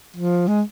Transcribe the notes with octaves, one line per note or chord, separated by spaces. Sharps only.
F3
G#3